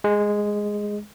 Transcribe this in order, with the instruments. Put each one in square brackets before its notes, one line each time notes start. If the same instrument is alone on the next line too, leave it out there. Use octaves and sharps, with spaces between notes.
[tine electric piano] G#3